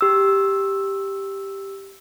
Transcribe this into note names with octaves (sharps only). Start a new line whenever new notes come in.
G4 E6